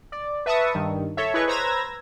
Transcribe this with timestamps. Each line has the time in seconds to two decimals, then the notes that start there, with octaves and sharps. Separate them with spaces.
0.12 D5
0.46 B4 E5 A5 C#6 D#6
0.74 G2 D#3
1.17 A4 C#5 E5
1.34 E4 G#4 B4 C#5 D#5 C#6
1.47 B4 C5 A#5 E6 G#6 A#6